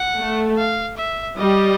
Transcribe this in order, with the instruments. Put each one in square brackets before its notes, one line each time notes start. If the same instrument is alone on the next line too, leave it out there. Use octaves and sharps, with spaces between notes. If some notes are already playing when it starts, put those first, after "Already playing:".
Already playing: [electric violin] F#5
[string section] A3
[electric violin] F5
E5
[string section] G3 [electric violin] D#5